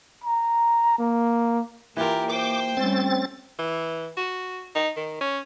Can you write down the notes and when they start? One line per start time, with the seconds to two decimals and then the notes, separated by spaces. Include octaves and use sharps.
0.24 A#5
0.98 A#3
1.97 E3 A#3 F4 G4 A#4
2.30 C5 G5 D6
2.77 G3 A3 C4 C#4 A6
3.59 E3
4.17 F#4
4.75 D#4
4.96 D#3
5.21 C#4